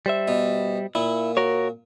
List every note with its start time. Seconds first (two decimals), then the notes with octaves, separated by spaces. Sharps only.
0.06 G3 C5 E5
0.28 B2
0.95 A#2 E4
1.37 F#4 A#4 C#5